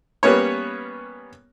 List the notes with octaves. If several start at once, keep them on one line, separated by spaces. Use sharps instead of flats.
G3 A#3 B3 C#4 C#5